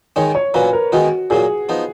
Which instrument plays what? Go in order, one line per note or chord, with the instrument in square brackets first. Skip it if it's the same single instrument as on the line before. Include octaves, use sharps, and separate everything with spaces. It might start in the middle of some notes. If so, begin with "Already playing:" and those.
[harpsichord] D#3 G#3 D#4 [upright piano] C#5
[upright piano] C#5
[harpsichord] A#2 F#3 A#3 C#4 [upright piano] B4
[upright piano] A#4
[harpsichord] D#3 G#3 B3 D#4 [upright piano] F#4
[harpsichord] A#2 F#3 A#3 [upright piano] G#4
[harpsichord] F3 B3 D#4